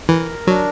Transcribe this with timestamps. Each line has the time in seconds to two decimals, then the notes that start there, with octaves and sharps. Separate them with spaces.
0.09 E3 A#4
0.47 F#3 D4